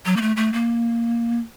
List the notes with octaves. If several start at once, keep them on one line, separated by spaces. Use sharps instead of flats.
F#3
A#3
A3
A3
A#3